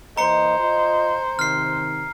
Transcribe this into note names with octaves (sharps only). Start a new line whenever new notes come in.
E3 A#3 C5 D#5 A#5 C#7
F4 D#5
C3 D#3 F6 C7